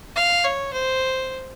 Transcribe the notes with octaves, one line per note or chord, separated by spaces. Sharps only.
F5
C#5
C5